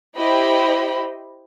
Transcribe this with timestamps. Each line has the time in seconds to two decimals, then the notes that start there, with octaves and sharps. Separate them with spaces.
0.18 E4 G4 C5 D#5 B5